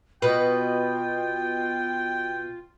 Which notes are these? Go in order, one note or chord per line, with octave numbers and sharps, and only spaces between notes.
B2 F4 B4 G5